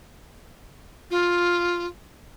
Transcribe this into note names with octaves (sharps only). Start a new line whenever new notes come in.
F4